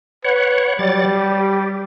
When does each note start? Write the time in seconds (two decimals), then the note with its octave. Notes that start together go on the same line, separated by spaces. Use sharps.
0.25 B4 C#5 F#5
0.79 F#3 G3 D5 A6
1.15 G4